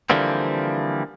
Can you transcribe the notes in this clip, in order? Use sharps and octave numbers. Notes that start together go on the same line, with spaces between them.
D3 E3 F3 G3 A#3 C4